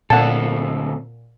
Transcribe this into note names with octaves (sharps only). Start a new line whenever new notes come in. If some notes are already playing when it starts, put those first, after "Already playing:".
D2 A#2 C4 A4 F#5 A5